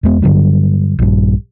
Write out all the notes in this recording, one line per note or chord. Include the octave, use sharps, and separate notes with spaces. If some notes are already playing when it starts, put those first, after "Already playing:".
E2 G#3 B3
G2 D3 F#3 G3
A#1 G2